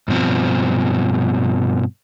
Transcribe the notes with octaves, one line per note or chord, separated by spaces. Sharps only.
G2 B2 F3 C4